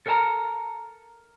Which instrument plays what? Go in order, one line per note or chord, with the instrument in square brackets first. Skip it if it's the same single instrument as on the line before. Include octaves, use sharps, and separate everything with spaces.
[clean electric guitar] A4 A#4 C#5 G5 A5 A#5